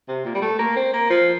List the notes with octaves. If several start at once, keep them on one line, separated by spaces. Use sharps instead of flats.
C3
A#2
G3
A3
A#3
C4
A#3
F3